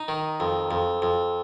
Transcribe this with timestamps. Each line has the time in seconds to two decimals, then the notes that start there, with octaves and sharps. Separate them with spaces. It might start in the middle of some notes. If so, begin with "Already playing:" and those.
Already playing: D#4
0.08 D#3
0.40 F2
0.71 F2
1.02 F2